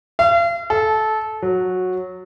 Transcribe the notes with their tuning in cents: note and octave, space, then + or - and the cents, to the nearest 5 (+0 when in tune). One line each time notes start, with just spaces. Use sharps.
F5 -40
A4 -20
F#3 -10